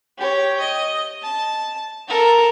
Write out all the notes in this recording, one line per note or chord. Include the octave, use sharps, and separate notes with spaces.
G4 C#5
D#5
A5
A4 A#4